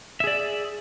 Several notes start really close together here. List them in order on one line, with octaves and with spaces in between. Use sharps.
E5 G#4 D5